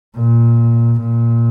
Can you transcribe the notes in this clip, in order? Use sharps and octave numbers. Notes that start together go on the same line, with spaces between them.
A#2
A#2